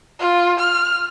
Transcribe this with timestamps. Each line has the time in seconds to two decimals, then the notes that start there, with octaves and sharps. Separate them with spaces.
0.20 F4
0.59 F6